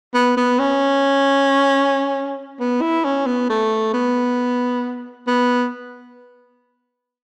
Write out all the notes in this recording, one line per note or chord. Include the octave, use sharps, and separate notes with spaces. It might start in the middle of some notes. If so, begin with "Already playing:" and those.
B3
B3
C#4
B3
E4
C#4
B3
A3
B3
B3